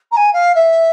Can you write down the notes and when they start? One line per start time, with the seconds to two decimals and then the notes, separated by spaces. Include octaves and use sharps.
0.11 A#5
0.16 G#5
0.33 F5
0.55 E5